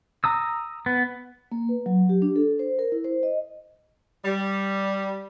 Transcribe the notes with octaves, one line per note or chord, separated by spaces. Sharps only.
A#5 D#6 E6
B3
A#3
B4
F#3
G4
D4
A4
C5
A#4
E4
C5
D#5
G3